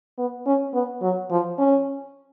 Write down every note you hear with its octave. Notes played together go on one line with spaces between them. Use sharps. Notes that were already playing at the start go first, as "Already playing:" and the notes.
B3
C#4
B3
F#3
F3
C#4